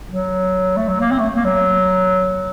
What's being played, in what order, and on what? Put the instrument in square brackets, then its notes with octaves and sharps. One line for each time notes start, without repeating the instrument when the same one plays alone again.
[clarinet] F#3
A3
F#3
A#3
C4
A3
A#3
F#3